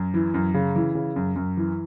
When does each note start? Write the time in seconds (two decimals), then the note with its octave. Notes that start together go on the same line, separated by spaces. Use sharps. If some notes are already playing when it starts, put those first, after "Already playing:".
Already playing: F#2
0.14 E3
0.34 F#2
0.54 C#3
0.76 E3
0.95 C#3
1.16 F#2
1.36 F#2
1.57 E3